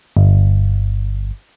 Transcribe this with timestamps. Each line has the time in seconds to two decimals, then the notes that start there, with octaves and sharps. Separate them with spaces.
0.17 G1